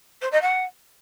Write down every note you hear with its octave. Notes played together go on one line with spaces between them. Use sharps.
C5
D#5
F#5